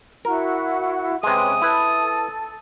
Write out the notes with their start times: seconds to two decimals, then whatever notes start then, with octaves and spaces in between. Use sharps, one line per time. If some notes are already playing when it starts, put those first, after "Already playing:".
0.25 E4 F#4 A#4 F#5
1.23 C3 G#3 C#4 B4 G5 D#6
1.62 E4 A4 B4